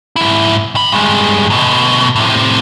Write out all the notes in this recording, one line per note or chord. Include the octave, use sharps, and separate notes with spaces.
G#2 E4
D#3 B5
G2 G#3
D2 B2
A2 C3